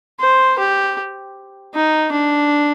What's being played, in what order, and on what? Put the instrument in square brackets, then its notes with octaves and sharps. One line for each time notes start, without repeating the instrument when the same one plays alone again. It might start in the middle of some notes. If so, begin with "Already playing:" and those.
[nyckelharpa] C5
G4
D#4
D4